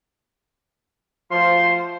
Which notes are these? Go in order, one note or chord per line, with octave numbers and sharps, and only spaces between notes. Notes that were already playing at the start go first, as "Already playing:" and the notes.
F3 A3 F#4 C5 F5 C6